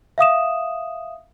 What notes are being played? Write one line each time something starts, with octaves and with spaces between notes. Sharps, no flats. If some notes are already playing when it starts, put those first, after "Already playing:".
E5 F5 D#6 E7